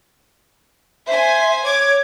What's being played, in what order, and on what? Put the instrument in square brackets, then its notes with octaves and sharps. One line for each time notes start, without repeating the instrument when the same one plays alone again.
[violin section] C5 G#5 [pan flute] E5
[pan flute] C#5 [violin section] D6 G#6